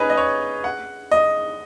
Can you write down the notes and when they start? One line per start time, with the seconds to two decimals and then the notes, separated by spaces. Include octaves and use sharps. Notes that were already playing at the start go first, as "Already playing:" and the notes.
Already playing: C#4 D#4 G#4 B4
0.10 D#5
0.17 C#5
0.64 F#5
1.11 D#5